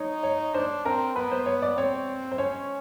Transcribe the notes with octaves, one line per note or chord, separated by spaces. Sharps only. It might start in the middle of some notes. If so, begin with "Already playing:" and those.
Already playing: D#4 C#5
C#5
D4 C5
C4 A#4
B3 B4
C5
C#5
D5
C4 C#5
C5
C#4 C#5